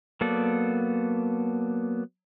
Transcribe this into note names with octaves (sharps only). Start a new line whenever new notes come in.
F#3 A#3 B3 A4 D5